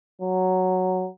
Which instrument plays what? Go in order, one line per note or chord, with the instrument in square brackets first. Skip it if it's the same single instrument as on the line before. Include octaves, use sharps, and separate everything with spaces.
[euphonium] F#3